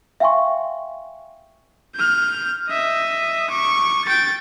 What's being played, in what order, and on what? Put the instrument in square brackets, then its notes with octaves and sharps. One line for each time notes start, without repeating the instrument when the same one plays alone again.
[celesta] E5 F5 G5 G#5 C6 C#6
[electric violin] F6 G6
D#5 E5
C#6 D6
G5 A6